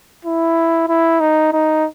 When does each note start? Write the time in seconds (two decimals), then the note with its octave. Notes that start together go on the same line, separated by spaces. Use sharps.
0.25 E4
0.88 E4
1.20 D#4
1.53 D#4